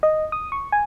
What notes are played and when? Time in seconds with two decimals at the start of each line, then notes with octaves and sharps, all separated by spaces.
0.03 D#5
0.32 D#6
0.52 C#6
0.72 G#5